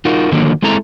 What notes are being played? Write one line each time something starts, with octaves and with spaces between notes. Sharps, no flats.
D#4 F4 F#4 A#4
D3 D#3 F3 F#3 A#3
G#3 C4 E4 A4 A#5